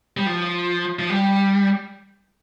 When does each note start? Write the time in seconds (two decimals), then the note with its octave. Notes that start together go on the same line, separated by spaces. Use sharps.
0.17 G3
0.26 F3
0.99 F3
1.10 G3